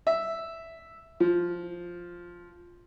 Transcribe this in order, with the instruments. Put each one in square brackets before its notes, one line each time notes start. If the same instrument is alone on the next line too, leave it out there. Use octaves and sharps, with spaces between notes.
[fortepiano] E5
F3